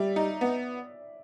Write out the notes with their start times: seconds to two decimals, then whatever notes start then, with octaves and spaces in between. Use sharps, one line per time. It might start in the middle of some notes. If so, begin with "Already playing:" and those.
Already playing: G3 D5 E5
0.16 D#4
0.41 B3